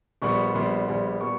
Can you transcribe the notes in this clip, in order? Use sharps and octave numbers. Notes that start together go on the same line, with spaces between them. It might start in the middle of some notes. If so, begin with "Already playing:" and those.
A#1 A#2 G3 B3 C#6
A#1 A#2 G3 B3 C6
A#1 A#2 G3 B3
A#2 G3 B3 C#6